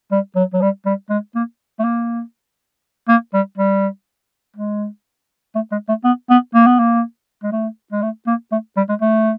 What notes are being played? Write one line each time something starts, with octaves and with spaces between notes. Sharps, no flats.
G3
F#3
F#3
G3
G3
G#3
A#3
A3
A#3
A#3
G3
G3
G#3
A3
G#3
A3
B3
B3
A#3
B3
A#3
G#3
A3
G#3
A3
A#3
A3
G3
G#3
A3